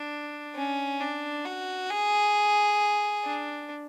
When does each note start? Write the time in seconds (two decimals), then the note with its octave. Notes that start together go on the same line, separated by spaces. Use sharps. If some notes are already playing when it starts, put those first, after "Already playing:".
Already playing: D4
0.56 C#4
1.00 D4
1.46 F#4
1.90 G#4
3.24 D4